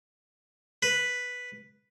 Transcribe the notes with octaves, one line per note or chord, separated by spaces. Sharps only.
B4